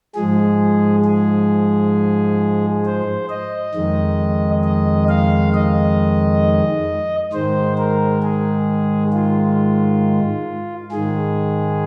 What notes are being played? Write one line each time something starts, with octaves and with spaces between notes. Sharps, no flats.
G#2 F3 G#3 G#4
G#4
C5
D#5
F2 D#3 G#3
D#5
F5
D#5
G#2 D#3 G#3 C5
A#4
G#4
F4
G#2 D#3 G#3 G#4